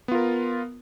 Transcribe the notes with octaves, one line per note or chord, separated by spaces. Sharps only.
B3 F4 A#4